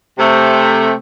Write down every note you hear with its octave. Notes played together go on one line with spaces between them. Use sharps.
C3 A3